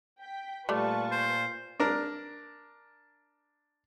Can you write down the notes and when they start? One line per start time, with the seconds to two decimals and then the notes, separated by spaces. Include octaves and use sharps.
0.20 G5 B6
0.69 A#2 G3 A3 F4 B4 A5 C#6
1.12 C5
1.80 D4 A#4